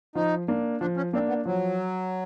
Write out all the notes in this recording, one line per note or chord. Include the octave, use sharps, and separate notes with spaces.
F3 D#4
A#3 D4
F3 D4
C#4
A#3 C4 D4
B3
F3 F#3